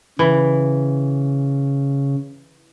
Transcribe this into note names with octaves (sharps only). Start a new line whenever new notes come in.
C#3 E3